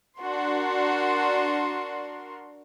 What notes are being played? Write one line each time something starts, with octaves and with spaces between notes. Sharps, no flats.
D4 F#4 A#4 C6